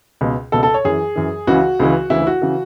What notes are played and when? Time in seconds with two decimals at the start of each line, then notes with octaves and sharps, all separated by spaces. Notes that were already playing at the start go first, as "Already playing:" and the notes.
0.21 C#2 B2
0.52 C#2 B2 A4
0.63 A4
0.74 C#5
0.84 F#2 E3 G#4
1.16 F#2 E3
1.47 C#2 C#3 E3 F#4
1.80 C#2 C#3 E3
2.10 D2 C#3 E3 E4
2.27 F#4
2.42 C#3 E3